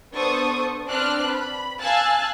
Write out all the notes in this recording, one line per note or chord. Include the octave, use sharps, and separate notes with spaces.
B3 D4 A4 C5 C#6 D#6
C4 D4 B4 F6 F#6
B5
F5 G#5 A5 E6 F#6 A6